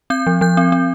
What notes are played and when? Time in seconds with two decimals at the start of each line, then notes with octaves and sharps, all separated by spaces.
0.10 C4 G6
0.27 F3
0.41 F3 G6
0.57 C4
0.72 C4